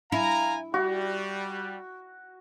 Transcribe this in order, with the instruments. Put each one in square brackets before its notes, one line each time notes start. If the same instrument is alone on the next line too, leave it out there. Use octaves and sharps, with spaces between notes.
[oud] E4 [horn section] F5 G#5 A#5
[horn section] G3 [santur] F#4